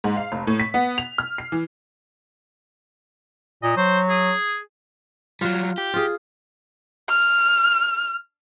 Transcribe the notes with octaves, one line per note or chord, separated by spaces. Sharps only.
G#2
F5
F1
A2
B6
B3
F7
F6
C7
E3
A#2 D#5
F#3 C5
G#4
F#3 G3 F4
G4
F4 G#4
F6